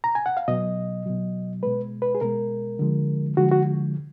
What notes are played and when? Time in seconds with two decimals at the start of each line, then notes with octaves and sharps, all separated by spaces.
0.04 A#5
0.15 G#5
0.26 F#5
0.37 F5
0.48 B2 F#3 D#5
1.06 B2 F#3
1.63 B2 G#3 B4
2.02 B4
2.15 G#4
2.21 B2 G#3 A#4
2.79 D3 F3 G#3
3.37 D3 F3 G#3 F#4
3.51 F#4